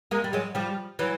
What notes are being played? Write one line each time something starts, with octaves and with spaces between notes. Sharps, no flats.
G#3 A#3
G3
F#3 G#3
F3 G3
E3 F#3